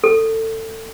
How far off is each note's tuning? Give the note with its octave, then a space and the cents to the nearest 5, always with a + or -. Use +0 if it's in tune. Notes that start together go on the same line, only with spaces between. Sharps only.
A4 +20